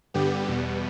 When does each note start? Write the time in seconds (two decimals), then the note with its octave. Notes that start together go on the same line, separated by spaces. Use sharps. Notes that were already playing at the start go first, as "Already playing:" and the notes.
0.14 G2 D3 G3 B3 G4
0.48 E2 B2 G3 B3